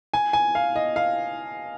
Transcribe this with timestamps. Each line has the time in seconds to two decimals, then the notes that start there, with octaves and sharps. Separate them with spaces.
0.14 G#5
0.33 G#5
0.55 F5
0.76 D#5
0.96 F5